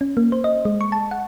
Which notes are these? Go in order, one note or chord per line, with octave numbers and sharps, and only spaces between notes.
C#4
A#3
C5
D#5
G#3
C#6
A5
F#5